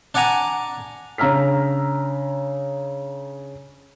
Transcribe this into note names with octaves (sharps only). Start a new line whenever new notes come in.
D4 D5 F#5 G#5 A#5 D6
C#3 D4 A#5 E6 F6 B6